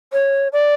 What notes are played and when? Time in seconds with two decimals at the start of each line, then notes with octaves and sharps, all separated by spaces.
0.13 C#5
0.53 D5